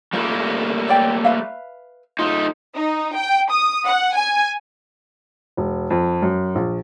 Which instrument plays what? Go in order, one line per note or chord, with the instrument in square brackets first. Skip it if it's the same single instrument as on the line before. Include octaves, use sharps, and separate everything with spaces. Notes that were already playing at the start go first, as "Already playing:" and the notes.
[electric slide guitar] G3 A3 A#3 [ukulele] F4 A#4
[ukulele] C#5 D5 G5
B4 E5 F5
[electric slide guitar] A3 D#4 [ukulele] F4
[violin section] D#4
G5
D#6
F#5
G#5
[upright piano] E1
F2
F#2
A#1